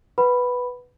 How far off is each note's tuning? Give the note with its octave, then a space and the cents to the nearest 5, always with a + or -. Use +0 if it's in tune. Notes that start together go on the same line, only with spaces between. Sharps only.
B4 +0 F#5 +0 B5 +0